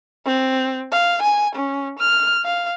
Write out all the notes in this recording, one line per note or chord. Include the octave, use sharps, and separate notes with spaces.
C4
F5
G#5
C#4
F6
F5